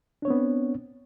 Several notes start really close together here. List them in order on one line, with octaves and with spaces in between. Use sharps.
D4 C#5 C4 B3